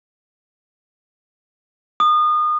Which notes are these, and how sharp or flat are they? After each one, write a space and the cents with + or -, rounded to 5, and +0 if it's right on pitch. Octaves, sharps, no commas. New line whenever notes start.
D#6 -30